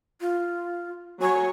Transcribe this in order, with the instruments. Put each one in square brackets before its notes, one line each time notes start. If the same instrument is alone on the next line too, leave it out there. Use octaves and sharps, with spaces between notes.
[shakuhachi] F4
[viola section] F#3 C#5 [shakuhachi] G#5